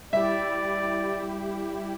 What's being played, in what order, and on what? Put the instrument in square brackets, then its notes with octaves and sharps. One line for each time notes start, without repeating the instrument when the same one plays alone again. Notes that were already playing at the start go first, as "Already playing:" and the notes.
[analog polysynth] G3 E4 G4 [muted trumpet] D5 [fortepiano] E5